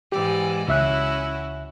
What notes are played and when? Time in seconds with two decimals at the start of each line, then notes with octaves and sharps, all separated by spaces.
0.12 G#2 E3 G4 D5
0.68 C#2 C#4 E4 F#4 E5 F#6